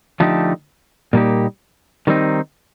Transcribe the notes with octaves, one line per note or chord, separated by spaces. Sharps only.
D3 F3 A3 D#4 G4
A#2 G3 A#3 D#4 G4
D#3 G3 C4 D#4